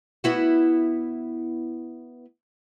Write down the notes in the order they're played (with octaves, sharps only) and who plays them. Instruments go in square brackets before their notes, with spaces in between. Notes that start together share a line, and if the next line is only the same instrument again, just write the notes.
[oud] B3 E4 F#4